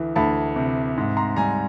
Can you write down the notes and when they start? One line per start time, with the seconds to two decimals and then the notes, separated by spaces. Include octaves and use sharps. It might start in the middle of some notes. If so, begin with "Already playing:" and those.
Already playing: D2 E3
0.16 D2 A5 B5
0.56 C3
0.97 G#2
1.17 A#5 C6
1.36 G3 G#5 A#5